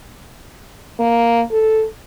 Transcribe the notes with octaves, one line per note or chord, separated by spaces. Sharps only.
A#3
A4